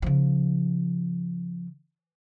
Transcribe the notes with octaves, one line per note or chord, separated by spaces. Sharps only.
C#3 F3